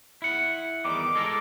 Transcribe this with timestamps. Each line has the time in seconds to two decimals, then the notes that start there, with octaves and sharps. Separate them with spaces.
0.22 E4 F#5
0.84 E2 D#3 G3 D6
1.15 G#3 A4 A#4